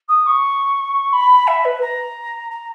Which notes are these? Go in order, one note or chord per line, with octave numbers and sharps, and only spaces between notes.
D#6
C#6
B5
E5
B4
A#5
A#5